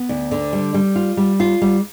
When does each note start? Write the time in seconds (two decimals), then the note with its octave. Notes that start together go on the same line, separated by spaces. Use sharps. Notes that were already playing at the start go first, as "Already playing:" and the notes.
Already playing: B3
0.09 D2
0.31 D3
0.53 G3
0.74 G3
0.96 F4
1.17 G3
1.40 F4
1.62 G3